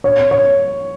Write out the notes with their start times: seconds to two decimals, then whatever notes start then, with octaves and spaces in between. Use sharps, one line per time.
0.04 C#5
0.31 C#5